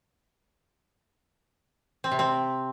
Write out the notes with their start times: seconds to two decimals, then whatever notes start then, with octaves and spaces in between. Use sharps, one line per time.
2.04 C4
2.11 C3
2.19 C4